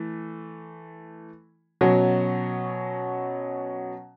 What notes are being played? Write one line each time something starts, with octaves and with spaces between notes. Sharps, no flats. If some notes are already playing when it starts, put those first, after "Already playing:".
Already playing: E3 A3
B2 F#3 C#4